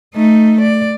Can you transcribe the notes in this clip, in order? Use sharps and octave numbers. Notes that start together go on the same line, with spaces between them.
A3 D#4
D5